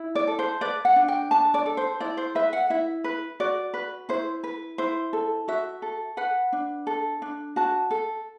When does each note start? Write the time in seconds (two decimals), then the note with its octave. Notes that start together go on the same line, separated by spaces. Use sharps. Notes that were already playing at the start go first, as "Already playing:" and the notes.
Already playing: E4
0.15 D5
0.27 A4
0.39 C5
0.61 B4 D5
0.85 F#5
0.96 D4
1.08 G5
1.31 D4 A5
1.54 D5
1.66 A4
1.77 C5
2.00 E4 D5
2.17 C5
2.35 B4 E5
2.53 F#5
2.70 E4 E5
3.04 B4
3.40 F#4 D5
3.74 B4
4.09 E4 C5
4.44 B4
4.78 E4 C5
5.13 A4
5.48 F#4 E5
5.82 A4
6.17 B4 F#5
6.53 D4
6.87 A4
7.22 D4
7.56 F#4 A5
7.91 A4